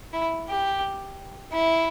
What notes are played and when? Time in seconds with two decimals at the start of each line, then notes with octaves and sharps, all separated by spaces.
0.13 E4
0.49 G4
1.52 E4